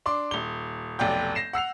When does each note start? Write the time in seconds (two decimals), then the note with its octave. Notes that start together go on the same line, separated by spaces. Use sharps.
0.06 D4 C6 D6
0.31 D#1 G7
0.99 F1 B1 D5 G5 G6
1.35 A#6 C7 E7
1.53 F#5 E6 C7 F7